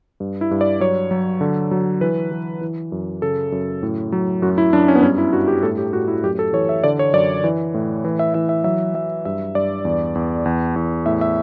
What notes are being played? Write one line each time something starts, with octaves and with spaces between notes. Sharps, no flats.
G2
E4
G2
D5
F#3 C#5
F#3
D3
F#3
E3 B4
E3
E3
F#2
C#3 A4
F#2
A2
F#3
F#2 F#4
E4
F#2 D4
C#4
B3
G2 C#4
E4
G2 F#4
G4
A2 A4
G4
A2 F#4
E4
F#2 G4
A4
E3 C#5
E5
D3 D5
C#5
F#2 D5
E3
A2
E3
E5
E3 E5
E5
F#3 E5
F#3 E5
G2 E5
G2 D5
E2
E2
E2
E2
A2 E5
E5